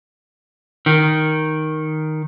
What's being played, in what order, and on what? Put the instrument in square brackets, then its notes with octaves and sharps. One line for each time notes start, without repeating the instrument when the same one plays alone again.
[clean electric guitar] D#3